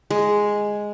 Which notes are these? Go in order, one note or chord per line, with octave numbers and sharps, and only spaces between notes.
G#3